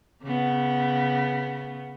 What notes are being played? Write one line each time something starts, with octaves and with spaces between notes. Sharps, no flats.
C#3 B3